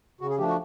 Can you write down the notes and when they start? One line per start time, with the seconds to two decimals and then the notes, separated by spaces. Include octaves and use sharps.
0.21 C#3 F#4
0.30 G#4
0.38 F3 A3 D4 G4
0.48 F#4